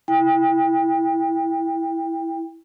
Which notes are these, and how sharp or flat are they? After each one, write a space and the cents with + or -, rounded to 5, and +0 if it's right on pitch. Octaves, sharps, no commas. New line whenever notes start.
E4 +0 G5 +25